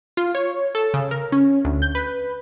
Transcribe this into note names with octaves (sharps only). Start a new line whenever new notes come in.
F4
C#5
A4
C#3
A#4
C#4
D2
G6
B4